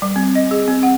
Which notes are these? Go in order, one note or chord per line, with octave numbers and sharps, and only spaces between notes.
G3
C4
D#5
G#4
C4
F#5